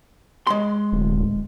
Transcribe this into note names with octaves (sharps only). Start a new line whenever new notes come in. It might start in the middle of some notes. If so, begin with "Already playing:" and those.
G#3 C6
D1